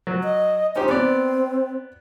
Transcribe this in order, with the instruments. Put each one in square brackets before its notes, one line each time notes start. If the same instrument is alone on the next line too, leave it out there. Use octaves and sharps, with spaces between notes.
[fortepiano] F#3
[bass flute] D#5
[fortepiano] C#4 D#4 G4 [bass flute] C5
[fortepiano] B3 D5 [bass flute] C4